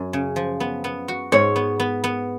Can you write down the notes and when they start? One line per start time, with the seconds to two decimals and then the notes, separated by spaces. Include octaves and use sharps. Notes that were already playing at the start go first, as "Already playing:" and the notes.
Already playing: F#2
0.13 C#3
0.36 F3
0.60 B3
0.84 B3
1.08 F#4
1.32 G#2 C#5
1.56 B3
1.80 B3
2.04 B3